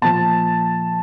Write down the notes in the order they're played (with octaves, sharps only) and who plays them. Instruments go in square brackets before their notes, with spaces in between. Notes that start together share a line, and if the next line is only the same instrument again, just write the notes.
[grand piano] A#2 F3 A5